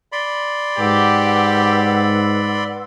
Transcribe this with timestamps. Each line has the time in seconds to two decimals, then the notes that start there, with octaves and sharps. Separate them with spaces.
0.12 D5 B5 C6
0.78 G#2 G4 B4 F#5 E6